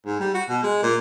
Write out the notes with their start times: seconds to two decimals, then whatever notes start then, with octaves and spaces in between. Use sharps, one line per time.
0.06 G#2
0.20 G3
0.34 F#4
0.49 B2
0.63 G#3
0.82 A#2